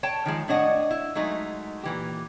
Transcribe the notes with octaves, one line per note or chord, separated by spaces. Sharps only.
C#5 G5 A5
D#3 F3 G#3
A2 D4 C#5 D#5 F#5
E4
F#3 G#3 A3 D#4
A#2 E3 G4